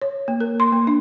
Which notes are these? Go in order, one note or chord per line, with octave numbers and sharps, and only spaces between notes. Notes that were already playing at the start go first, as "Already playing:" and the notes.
C#5
A#3
A#4
C6
A#3
D4